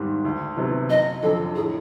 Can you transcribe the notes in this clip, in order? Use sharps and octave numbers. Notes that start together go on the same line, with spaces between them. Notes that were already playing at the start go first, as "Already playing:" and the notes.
Already playing: G#1 G#2 D#3 G3
D2
C3 D#3 F#3 B3
F#1 D#5
F2 D3 F#3 A4
A2 G#4